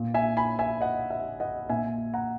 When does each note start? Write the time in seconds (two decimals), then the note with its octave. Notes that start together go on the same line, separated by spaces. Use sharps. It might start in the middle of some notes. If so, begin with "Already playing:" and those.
Already playing: A#2
0.14 E5 G#5
0.37 G#5 B5
0.59 E5 G#5
0.81 D#5 F#5
1.11 E5
1.40 D#5 F#5
1.69 A#2 E5 G#5
2.14 F#5 A#5